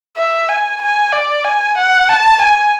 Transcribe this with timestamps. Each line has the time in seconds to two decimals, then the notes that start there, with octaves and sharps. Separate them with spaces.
0.17 E5
0.48 G#5
0.82 G#5
1.13 D5
1.45 G#5
1.77 F#5
2.09 A5
2.41 G#5